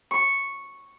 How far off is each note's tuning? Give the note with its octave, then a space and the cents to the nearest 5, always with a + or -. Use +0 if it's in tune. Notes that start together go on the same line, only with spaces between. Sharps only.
C#6 -5